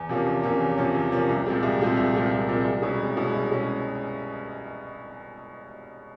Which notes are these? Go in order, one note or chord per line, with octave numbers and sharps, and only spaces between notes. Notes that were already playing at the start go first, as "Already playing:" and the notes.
Already playing: E2
C3 F3 A#3 C#4
E2
C3 F3 A#3 C#4
E2
C3 F3 A#3 C#4
E2
C3 F3 A#3 C#4
C2
A#2 F3 G#3 C4
C2
A#2 F3 G#3 C4
C2
A#2 F3 G#3 C4
C2
A#2 F3 G#3 C4
C2
B2 G#3 C#4 E4
C2
B2 G#3 C#4 E4
C2
B2 G#3 C#4 E4